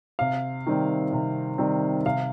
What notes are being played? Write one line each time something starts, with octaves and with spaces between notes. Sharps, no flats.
C3 F5
D#3 G3 C4
C3
D#3 G3 C4
C3 F5